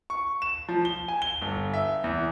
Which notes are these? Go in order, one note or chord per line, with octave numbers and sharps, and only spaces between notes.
C#6
E7
F3
G7
G#5
G7
G1
E5
E2